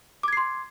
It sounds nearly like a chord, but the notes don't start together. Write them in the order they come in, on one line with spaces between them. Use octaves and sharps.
D6 G#6 C7 C6